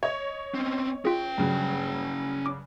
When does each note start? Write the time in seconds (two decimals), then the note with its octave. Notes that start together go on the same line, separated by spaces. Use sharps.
0.03 C#5 D#5 G#6
0.54 C4 C#4
1.05 C#4 F4 G#4 G5
1.38 G2 C#3 F#3
2.46 D6